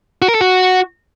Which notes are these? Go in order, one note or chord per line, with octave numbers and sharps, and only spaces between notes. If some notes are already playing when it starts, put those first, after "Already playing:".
F#4
A#4
A4
F#4